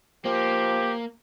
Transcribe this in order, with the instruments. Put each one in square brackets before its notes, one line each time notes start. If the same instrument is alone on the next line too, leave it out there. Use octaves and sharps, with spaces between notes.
[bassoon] F3 [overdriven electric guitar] A#3 [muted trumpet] G4